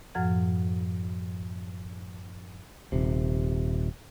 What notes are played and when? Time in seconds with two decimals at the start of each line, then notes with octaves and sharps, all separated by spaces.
0.15 F#2 A2 F3 F#5 F6 G#6
2.92 D#1 C3